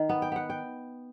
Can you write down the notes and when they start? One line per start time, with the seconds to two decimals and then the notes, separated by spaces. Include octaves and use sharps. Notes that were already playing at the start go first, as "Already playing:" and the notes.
Already playing: D#3
0.09 B3
0.22 G5
0.32 B3 F#5
0.50 G5